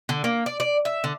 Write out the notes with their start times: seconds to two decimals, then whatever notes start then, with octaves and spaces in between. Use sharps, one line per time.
0.09 D3
0.24 A#3
0.46 D5
0.60 D5
0.85 E5
1.04 D3